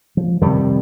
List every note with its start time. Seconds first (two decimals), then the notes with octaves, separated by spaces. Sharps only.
0.17 F3
0.41 F2 C3 D#3 G3